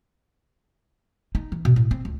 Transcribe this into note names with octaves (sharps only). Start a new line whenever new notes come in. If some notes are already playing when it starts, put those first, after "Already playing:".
D#4
E3
B2
A2
C4
C#2